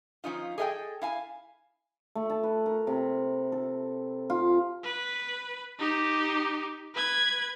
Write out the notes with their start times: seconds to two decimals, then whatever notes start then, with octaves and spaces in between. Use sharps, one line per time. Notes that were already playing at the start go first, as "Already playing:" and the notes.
0.24 F3 C#4 D#4 F4
0.58 G#4 A4 D#5 F5 G5
1.02 E4 F5 G#5
2.15 A3
2.30 A5
2.43 B4
2.66 A#4
2.87 C3
3.52 A4
4.30 F4
4.84 B4
5.79 D#4 G4
6.95 B4 G#6